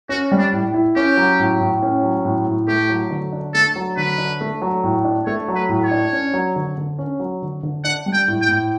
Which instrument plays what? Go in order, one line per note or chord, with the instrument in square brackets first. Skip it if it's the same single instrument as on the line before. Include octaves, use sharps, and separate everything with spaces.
[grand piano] C#4 [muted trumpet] F#4
[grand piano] G3
[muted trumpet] D4
[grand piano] A2
E4
[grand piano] C#4 [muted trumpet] G4
[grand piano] F#3
A2
A2
C#4
F#3
A2
A2
[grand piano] A3 [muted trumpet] G4
[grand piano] F#3
D3
D4
[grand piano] A3 [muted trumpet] A4
[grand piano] F#3
[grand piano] D3 [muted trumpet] B4
[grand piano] D4
A3
F#3
A2
D4
[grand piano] A3 [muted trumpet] C#5
[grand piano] F#3
[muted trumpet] B4
[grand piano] A2
[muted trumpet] C#5
[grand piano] D4
C#4
F#3
D3
D3
C#4
F#3
D3
D3
[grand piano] D4 [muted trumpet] F#5
[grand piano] G3
[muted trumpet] G5
[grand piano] A2
[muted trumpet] G5
[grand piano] A2